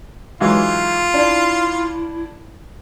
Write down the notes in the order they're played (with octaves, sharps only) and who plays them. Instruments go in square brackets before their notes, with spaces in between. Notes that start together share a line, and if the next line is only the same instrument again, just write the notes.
[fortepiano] G#2 E3 F#3 [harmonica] F4
[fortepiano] D4 [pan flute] E4